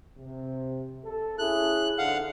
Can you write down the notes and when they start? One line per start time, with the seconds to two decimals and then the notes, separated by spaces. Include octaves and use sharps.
0.18 C3
1.05 A4
1.39 C#4 E4 G#4 F#6
1.98 G#2 D3 F5 F#5